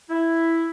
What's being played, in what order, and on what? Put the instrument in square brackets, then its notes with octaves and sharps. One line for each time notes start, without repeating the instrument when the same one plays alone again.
[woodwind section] E4